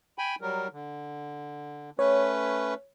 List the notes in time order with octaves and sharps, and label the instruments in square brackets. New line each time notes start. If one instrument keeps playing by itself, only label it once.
[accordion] G5 G#5 B5
F#3 G3 A#4
D3
[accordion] A3 C#4 B4 [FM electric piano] C#5